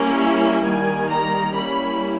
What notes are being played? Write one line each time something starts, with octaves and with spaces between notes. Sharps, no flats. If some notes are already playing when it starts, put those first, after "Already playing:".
Already playing: G3 A#3 C#4 E4
E5
D#3 G3 A#3 G#5
A#5
G3 A#3 C#4 E4 B5